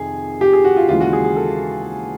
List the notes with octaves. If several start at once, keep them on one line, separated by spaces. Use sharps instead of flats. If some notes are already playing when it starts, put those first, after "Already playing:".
Already playing: F2 C3 D#3 G#4
G4
G#4
F#4
F4
D#2 C#3 E3 G#3 F4
F#4
G#4
G#4
A4